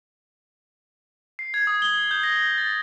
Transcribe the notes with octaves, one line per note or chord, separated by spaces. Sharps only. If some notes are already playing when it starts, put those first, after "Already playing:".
C7
G#6
D#6
G7
G6
A#6
A6